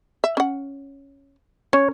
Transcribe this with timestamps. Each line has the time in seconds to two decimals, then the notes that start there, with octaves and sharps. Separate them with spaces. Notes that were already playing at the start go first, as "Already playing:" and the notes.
0.24 E5
0.37 C#4 F#5
1.73 C#4 C#5